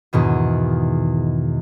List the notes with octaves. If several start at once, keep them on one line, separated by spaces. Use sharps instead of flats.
E2 G#2 B2 D#3